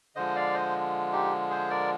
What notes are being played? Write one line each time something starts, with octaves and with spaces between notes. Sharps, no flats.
D3 F3 G#3 C5 D#5
D5 F5
C5 D#5
D#4 G4
G#4 C5
A#4 D5